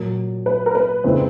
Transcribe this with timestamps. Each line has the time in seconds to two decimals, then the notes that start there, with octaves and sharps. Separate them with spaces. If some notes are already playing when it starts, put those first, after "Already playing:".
Already playing: A#2 F#3 A#3
0.46 B4
0.66 A#4
0.75 B4
1.04 F2 C#3 E3 G#3 C4 C5